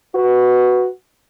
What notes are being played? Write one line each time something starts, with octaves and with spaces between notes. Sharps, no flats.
F#4 B4